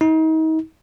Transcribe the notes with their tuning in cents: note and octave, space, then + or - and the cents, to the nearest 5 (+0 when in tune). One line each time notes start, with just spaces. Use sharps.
D#4 +35